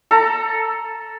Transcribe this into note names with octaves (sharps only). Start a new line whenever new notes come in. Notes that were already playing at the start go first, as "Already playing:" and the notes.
A4 A#5